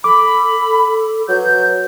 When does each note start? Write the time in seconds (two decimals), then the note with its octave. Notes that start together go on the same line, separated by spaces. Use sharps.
0.04 A4 B5 D6
1.29 F#3 B4 G6